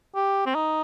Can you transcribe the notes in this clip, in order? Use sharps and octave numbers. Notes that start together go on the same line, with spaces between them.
G4
C4
D#4